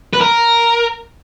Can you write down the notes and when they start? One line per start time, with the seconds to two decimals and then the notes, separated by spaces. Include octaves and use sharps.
0.14 B4
0.21 A#4